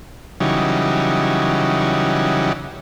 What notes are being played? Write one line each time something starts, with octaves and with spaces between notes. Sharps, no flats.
C#3 E3 F#3 G3 D#4